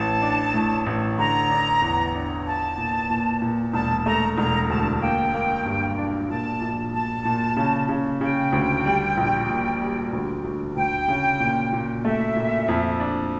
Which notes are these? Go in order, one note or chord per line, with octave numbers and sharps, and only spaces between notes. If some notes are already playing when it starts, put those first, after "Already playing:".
Already playing: A1 A5
D4
A2
A1
D3 A#5
D4
E2
D4
F4 A5
A#2
A#2
A#2
E1 A5
A3 A#5
E1 A#5
D2 A5
A#3 G5
A#3
G2
D4
A#2 A5
A#1
A#2 A5
A#2
C#3
C#3
C#3 G5
D2
G3
A#1
A#2
G3
D2
D2
D2 G5
C#3
A#2
A#2
A3 E5
A#2
F2
D4